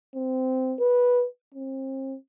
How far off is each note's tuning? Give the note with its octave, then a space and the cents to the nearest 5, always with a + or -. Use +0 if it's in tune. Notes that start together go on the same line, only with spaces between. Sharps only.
C4 -15
B4 -10
C4 +35